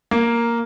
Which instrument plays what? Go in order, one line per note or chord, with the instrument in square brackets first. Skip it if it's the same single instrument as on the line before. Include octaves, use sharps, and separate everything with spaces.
[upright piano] A#3